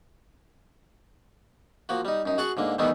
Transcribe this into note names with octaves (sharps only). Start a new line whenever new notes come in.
F3 A#3 F#4
G3 D#4
F#2 D#4
F#4 G#4 F#5 A5 C#6
G#2 D3 A#3
D#3 E3 G3 A3 B3 D#4